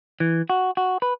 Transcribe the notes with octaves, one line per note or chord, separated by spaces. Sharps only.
E3
F#4
F#4
B4